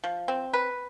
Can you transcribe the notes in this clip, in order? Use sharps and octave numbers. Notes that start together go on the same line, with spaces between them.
F3
C4
B4